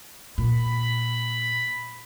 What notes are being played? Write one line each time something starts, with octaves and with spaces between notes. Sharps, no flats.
A#2 B5